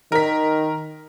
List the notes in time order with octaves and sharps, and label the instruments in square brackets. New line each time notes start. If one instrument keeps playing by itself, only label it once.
[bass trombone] D#3 [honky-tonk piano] A#4 B6